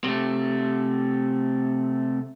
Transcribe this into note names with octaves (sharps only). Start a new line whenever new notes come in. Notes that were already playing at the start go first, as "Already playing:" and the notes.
C3 A3